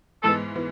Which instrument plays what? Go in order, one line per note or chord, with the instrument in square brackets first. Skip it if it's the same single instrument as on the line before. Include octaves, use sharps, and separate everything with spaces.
[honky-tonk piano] G#2 E3 G#3 B3 [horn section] A4
[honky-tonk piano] E3 B3